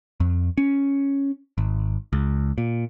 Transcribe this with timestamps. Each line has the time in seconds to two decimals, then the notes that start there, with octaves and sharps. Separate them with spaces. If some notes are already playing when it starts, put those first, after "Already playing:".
0.20 F2
0.58 C#4
1.58 G#1
2.13 C#2
2.58 A#2